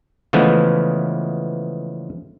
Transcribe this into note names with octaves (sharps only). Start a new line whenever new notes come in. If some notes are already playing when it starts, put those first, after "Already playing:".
C#3 E3 F3 G#3 A3 B3